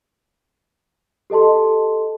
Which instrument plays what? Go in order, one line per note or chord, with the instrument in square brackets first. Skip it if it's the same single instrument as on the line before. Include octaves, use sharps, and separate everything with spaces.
[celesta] G4 A4 D#5 A5 C6